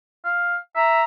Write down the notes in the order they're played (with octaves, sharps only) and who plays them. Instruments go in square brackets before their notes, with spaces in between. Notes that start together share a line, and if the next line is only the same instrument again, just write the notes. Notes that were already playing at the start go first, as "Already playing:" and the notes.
[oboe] F5
[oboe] E5 [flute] A#5